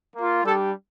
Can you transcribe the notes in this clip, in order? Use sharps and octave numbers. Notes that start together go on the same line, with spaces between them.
A#3 F4
G3 D4 G4 A4